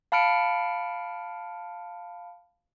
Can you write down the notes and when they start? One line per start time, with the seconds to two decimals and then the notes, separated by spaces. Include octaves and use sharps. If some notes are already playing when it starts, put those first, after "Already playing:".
0.12 F5 A5 B5 F6 C#7 D7